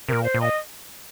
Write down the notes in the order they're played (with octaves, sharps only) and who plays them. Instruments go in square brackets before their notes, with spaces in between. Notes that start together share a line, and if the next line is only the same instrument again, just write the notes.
[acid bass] C3 [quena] A#4
[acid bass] A#2
[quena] C5
[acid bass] A#2
[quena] D#5